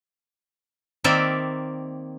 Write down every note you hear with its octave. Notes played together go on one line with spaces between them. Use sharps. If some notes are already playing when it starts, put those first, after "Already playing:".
D#3 A#3 C4 D5 E5